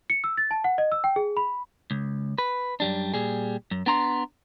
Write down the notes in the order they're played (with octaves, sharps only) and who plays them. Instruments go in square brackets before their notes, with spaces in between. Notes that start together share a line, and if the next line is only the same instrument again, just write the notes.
[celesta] C#7
E6
A6
A5
F#5
D#5
E6
G5
G#4
B5
[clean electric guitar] C#2
B4
F#2 G3 D4
A#2 G3 G#4
F#2
B3 D4 A#5 C6